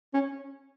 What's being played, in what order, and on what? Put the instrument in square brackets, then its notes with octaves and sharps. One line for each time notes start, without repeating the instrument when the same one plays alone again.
[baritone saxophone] C#4